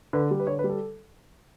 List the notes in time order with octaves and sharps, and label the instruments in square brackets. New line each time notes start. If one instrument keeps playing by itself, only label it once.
[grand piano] D3 B4
G3
B4
D3 C#5
B4
G3
A4